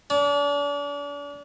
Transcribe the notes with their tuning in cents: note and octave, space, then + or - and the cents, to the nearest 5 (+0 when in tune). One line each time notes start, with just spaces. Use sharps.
D4 -40